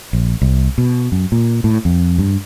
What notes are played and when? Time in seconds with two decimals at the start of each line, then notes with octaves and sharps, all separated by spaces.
0.13 A#1
0.42 C2
0.78 B2
1.12 F#2
1.32 A#2
1.64 A2
1.85 F2
2.18 G2